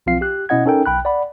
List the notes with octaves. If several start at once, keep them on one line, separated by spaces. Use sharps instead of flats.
B1 F3 C4 F4 F5 C7
G4 F#6
B2 C#4 E4 D#5 F#5 G#6
C#4 D#4 A4 A#4 G5
B1 G5 B5 F#6
D5 F#5 B5